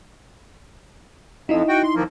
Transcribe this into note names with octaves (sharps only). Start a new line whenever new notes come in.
F2 D#4 E4 D#5
F#4 G5
C6
D#2 F3 A#3